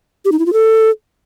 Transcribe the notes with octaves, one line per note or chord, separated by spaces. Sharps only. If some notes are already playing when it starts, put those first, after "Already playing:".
G4
D#4
E4
F4
A4